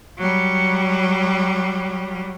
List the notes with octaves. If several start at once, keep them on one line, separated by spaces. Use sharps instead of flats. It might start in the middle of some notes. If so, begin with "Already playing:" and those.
F#3 G3